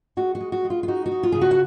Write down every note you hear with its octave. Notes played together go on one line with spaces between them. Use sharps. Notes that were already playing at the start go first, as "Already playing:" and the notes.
G#3 F#4
F#4
G#3
F#4
G#3
F4
F4
D#4 F#4
F#4
D#4
F4
C#3 G#4
F#4
F#5